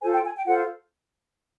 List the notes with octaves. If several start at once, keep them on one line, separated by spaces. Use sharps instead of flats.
F4 A4 C5 G#5
G5
G#5
G5
F4 A4 C5 F#5